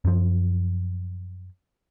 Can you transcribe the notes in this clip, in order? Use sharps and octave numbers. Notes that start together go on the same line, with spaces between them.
F#2 F3